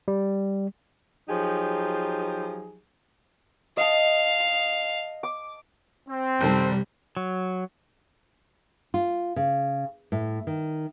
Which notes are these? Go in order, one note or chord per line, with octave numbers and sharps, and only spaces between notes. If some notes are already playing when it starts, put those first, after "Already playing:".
G3
F3 F#3 D#4 G4 G#4
D#5 F5 A5
D6
C4
F#1 C3 D#3 G3 A4
F#3
F4
C#3
A2
D#3